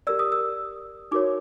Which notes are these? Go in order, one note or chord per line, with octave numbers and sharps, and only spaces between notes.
G4 A#4 D5 E6
D#6
E6
D#4 F#4 A#4 C#5 D6